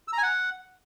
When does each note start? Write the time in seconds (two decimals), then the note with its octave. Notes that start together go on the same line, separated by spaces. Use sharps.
0.08 E6
0.13 A#5
0.18 G#5
0.23 F#5